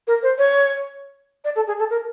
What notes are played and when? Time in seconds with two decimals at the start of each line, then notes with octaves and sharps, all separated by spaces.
0.07 A#4
0.23 C5
0.38 C#5
1.44 D5
1.56 A4
1.67 G#4
1.79 A4
1.90 A#4